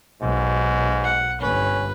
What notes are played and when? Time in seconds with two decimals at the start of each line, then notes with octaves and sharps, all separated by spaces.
0.21 B1 G#2
1.04 F#5
1.41 G1 C#4 B4